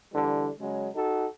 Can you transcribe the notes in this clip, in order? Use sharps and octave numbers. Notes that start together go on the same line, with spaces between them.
D3 E3 G3
C#3 F#3 G#3
D#4 F#4 A4